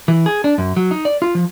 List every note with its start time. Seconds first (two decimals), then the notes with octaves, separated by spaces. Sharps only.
0.08 E3
0.26 G#4
0.44 D4
0.58 F#2
0.76 F#3
0.91 D#4
1.05 D5
1.22 F4
1.35 F3